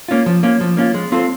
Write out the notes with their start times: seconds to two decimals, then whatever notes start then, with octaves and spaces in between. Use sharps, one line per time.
0.08 A#3 C#4 F4
0.26 F3
0.43 A#3 C#4 F4
0.61 F3
0.77 A#3 C#4 F4
0.94 G#3
1.12 C4 F4 A4 C5